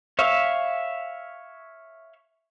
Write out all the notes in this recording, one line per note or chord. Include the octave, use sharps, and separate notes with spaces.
C#5 E5 F5